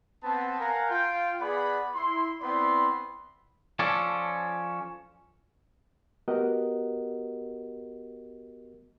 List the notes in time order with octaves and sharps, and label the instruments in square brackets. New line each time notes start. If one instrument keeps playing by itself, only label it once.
[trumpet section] B3 C4 F#5 A5
A#4 F5 F#5 G#5 A#5
F4 F5 G5
B3 G#4 D5 F#5 B5
E4 C6
B3 C4 E4 D5 B5 C6
[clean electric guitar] F3 C#4 A4 D5
[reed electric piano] B3 F#4 G4 A#4 D#5 F#5